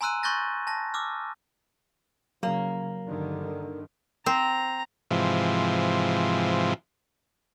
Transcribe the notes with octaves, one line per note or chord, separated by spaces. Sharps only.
G#5 A#5 C6 E6 F#6 D#7
C6 C#6 F#6 G6 A6 A#6
A5 A#6
D6 E6 F6
C#3 F#3 A#3
G2 D3 D#3
C4 A#5
G#2 C3 E3 F3